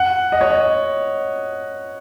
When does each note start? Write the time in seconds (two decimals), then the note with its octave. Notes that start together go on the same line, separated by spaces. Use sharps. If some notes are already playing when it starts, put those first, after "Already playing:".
Already playing: F#5
0.32 D#5
0.41 C#5
0.50 D#5